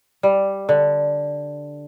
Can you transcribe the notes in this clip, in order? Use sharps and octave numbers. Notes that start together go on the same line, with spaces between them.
G3
D3